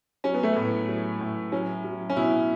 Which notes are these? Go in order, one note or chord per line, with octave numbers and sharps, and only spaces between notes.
F#3 C#4
B3
A3
A2 B3
F#3
A2
F#3 C#4
F#3
C#4
B2 E4